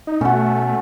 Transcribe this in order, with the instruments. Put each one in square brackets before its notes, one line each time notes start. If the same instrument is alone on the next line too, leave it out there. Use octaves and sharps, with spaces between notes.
[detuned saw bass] D#4
[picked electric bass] B2 [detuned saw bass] A3 [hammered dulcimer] C#4 F#4